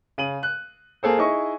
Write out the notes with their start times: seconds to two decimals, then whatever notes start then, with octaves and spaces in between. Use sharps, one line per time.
0.18 C#3 D#7 F#7
0.43 F#6
1.03 A#3 G#4 A4 C5
1.18 D#4 E4 G#4 D#5 C#6